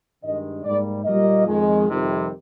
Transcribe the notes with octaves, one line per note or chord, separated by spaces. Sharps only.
G2 D#3 G#3 D#5
G#2 G3 A#3 D5
A#2 G3 A#3 D#5
F2 D#3 G#3
F2 C3 D#3 G3